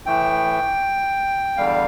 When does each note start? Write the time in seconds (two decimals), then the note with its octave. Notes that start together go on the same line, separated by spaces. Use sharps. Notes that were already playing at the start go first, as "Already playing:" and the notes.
0.06 A2 E3 A3 G5
1.57 E2 D3 G3 F5